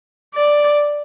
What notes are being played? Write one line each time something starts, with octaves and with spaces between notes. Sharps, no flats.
D5